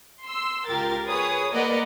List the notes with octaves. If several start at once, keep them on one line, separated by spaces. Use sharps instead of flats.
C6 E6
C#2 F4 G4 A#4 A6
G#4 B4 C#5 D#6
A#3 A#4 B4 D5 D#5 F#5